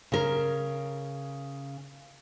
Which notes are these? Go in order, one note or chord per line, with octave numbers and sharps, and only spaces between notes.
C#3 A#4